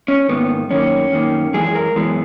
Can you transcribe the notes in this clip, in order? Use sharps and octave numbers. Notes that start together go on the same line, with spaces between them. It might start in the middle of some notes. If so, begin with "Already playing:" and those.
C#4
G#2 D#3 A#3 B3
F#2 D#3 A#3 C#4
F#2 D#3 A#3
F#2 E3 G#3 G#4
A#4
F#2 E3 G#3 B3